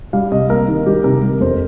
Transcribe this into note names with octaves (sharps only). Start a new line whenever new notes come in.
G3 F5
C3 D#5
A#3 A#4
D#3
G3 G4
C3 A#4
G3
F2 C5